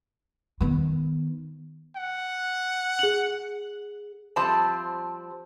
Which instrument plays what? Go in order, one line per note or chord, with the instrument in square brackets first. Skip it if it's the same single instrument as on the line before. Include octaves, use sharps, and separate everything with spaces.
[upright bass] D#3 B3
[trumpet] F#5
[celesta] G#4 F#7
[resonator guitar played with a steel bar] F3 G3 C4 C5 A5